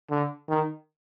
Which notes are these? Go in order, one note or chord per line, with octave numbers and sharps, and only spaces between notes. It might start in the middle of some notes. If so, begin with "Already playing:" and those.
D3
D#3